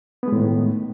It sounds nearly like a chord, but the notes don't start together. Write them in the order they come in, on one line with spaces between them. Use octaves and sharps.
B3 G#3 A2 D#3